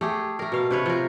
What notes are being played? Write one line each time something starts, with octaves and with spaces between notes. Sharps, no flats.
A3 G4 G#4
A3 A#4
B2 F5
C3 B4 C#5
F3 A#4